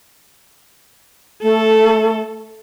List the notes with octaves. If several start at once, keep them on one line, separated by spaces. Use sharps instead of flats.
A3 A4